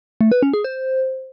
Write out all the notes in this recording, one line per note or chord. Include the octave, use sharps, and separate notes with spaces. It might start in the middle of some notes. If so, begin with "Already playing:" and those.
A3
B4
C#4
G#4
C5